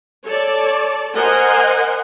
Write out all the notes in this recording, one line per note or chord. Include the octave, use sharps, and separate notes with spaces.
A4 C#5 D5 A5
A#4 C5 D#5 F#5 G#5